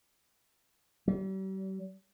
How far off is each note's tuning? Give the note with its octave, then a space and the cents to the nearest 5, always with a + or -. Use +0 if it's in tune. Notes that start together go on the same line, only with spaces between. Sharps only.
G3 -40